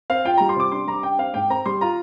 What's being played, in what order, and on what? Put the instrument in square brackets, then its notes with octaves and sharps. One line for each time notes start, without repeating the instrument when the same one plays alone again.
[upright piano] C4 F5
F4 G5
G3 A#5
C6
C3 D6
D4 C6
G3 A#5
D4 G5
C4 F5
G#2 G5
C4 A#5
G3 C6
F4 A#5